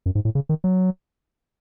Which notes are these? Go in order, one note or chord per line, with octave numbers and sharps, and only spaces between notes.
F#2
G#2
A2
C#3
D#3
F#3